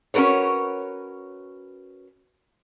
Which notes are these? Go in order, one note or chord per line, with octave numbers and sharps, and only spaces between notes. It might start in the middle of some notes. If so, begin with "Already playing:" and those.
C#4 F#4 A#4 B4 C#5